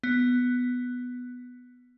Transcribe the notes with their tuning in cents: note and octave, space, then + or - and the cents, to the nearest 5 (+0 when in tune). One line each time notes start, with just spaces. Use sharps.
B3 +5